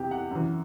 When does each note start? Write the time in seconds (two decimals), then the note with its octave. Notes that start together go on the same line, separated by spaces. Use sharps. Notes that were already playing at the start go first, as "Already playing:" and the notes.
Already playing: E2 C3 E3 G4
0.11 F#5
0.31 F#2 E3